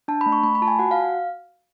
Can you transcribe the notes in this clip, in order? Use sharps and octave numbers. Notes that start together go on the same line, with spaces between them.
D4 A5
B5
A3
C#6
A3 B5
B5
F4 A5
G#5
F#4 F#5
F5